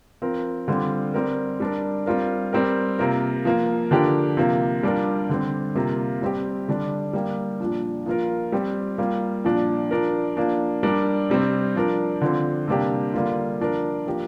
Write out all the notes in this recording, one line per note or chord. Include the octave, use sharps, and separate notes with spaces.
F3 C4 F4 A#4
D3 G3 C4 F4
G3 C4 A#4
G3 D4 A#4
G3 C4 F4 A#4
G3 C4 G4 A#4
C3 A#3 F4 A#4
F3 A#3 F4
D3 F3 D4 G4 A#4
C3 F3 A#3
G3 D4 F4 A#4
D3 G3 C4
C3 G3 A#3 F4
G3 C4 G4
D3 G3 D4
G3 A#3 G4
A#2 F3 D4
F3 A#3 F4 A#4
G3 C4 G4
G3 A#3 F4
A#2 F3 D4
F3 D4 A#4
F3 A#3 D4
G3 D4 A#4
C3 G3 C4
F3 D4 A#4
D3 F3 C4
C3 G3 A#3 D4 G4
D3 G3 A#3 F4
F3 D4 A#4
F3 A#3 G4 A#4